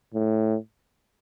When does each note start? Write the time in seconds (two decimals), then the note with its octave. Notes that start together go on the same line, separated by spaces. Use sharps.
0.14 A2